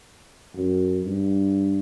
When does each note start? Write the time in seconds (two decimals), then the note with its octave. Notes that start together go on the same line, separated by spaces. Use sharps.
0.56 F#2
1.05 G2